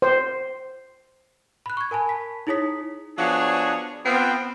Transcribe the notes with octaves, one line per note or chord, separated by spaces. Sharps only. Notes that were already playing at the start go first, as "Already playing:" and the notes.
C5
B5 F#6
C#6 G#6
A#4 G#5 A5 B5
A5 B6
D#4 E4 G#4 C#5 D#6 B6
F3 B3 D4 F#4 G#4 C#5
B3 C4 F4